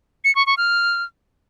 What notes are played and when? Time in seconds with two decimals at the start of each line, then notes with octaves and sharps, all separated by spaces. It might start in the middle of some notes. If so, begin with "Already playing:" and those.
0.24 C#7
0.35 C#6
0.46 C#6
0.57 F6